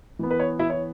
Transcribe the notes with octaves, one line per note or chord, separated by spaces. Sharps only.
E3 B3
B4
C#5
E4 E5
C#5